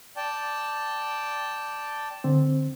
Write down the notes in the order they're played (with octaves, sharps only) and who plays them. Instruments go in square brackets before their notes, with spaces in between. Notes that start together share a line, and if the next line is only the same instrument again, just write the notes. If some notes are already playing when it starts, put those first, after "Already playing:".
[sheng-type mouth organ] D5 G5 A5
[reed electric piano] D3 C4